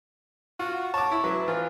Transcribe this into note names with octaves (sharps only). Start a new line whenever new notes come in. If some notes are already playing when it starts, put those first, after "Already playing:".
F4 F#4
C#5 A5 D6
E4
F#3 B4 E5
E3 F3 F4